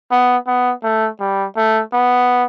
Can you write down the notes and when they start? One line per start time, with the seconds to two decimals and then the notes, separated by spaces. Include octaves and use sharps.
0.11 B3
0.47 B3
0.84 A3
1.20 G3
1.56 A3
1.93 B3